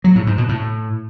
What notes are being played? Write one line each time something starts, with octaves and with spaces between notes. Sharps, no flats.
F#3
A2
G#2
B2
A2